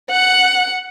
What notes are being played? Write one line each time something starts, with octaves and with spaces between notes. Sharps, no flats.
F#5 F#6